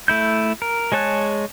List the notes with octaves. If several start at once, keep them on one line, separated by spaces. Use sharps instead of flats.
A3 E4 G6
A#4
G#3 G#4 C#5 A5 F#6